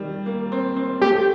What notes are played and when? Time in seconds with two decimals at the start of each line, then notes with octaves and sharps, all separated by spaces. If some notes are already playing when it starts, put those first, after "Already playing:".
Already playing: D#3 G3
0.26 A#3
0.52 C4
0.76 C4
1.01 A3 G4